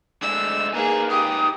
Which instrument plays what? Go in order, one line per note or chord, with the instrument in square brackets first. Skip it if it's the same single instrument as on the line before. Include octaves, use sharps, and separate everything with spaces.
[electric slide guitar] G#3 A3 D4 [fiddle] E6
[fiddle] A#3 G#4 [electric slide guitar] D#4 B4 G#5
[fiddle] G4 [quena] D#6